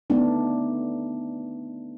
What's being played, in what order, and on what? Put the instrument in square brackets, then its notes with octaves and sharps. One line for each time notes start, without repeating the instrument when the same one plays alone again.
[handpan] A3 B3 D4 D#4